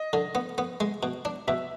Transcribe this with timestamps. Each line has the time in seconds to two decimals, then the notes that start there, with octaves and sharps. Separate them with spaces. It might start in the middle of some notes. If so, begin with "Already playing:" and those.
Already playing: D#5
0.13 D3
0.35 B3
0.58 B3
0.80 G#3
1.03 B2
1.25 D4
1.47 B2 E5